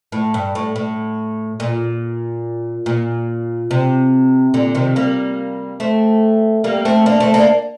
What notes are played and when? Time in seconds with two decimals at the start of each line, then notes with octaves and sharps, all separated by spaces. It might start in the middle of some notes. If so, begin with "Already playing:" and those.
0.12 A2
0.34 G2
0.55 A2
0.76 A2
1.60 A#2
2.86 A#2
3.71 C3
4.54 A#2 D3
4.75 C3 D#3
4.96 G3 A#3
5.80 A3 C4
6.64 G3 A#3
6.85 A3 C4
7.06 A#3 D4
7.20 A3 C4
7.34 A#3 D4